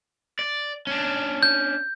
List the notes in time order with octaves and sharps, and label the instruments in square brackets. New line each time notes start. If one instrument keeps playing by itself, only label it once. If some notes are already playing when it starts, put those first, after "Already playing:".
[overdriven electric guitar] D5
C#4 D4
[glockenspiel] G6